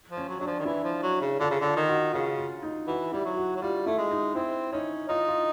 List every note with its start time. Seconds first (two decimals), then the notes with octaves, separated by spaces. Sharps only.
0.10 F3
0.17 C#4
0.29 F#3
0.40 F#3 D4
0.47 F3
0.59 D#3
0.65 E3 E4
0.84 F3
1.03 F#3
1.21 C#3
1.40 D3 F4
1.50 C#3
1.61 D3 F4
1.76 D#3
1.89 F#4
2.13 C#3 F4
2.38 F4
2.63 D#4
2.87 E3 F#4
3.12 G3 E4
3.25 F#3
3.37 F#4
3.57 F#3
3.62 G3 F4
3.86 A3 E4
3.98 G#3
4.11 D#4
4.35 C4 E4
4.72 C#4 D#4
5.09 D#4 F4
5.28 F4